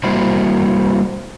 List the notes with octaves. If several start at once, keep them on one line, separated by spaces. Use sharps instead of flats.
G3 A#3 C4 E4 F#4 C5